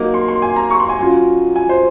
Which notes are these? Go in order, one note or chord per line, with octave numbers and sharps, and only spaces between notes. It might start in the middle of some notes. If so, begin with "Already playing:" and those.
Already playing: F#3 A#3 D#4
C6
C6
G#5
A#5
C#6
C6
G#5
F#3 C#4 F4
G#5
C5